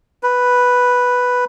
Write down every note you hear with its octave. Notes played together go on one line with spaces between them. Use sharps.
B4